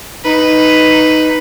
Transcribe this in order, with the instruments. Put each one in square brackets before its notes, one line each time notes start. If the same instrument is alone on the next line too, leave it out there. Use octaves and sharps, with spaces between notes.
[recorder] D#4 [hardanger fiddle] B4